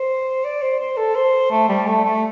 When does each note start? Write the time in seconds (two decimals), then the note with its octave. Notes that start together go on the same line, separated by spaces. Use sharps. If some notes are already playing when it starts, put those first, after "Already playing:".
Already playing: C5
0.44 D5
0.62 C5
0.79 C5
0.97 A4
1.15 C5
1.51 A3
1.69 G3
1.87 A3
2.05 A3